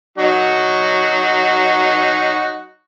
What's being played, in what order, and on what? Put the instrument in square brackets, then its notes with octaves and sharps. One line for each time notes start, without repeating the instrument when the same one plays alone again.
[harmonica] F#3 D#4 F#4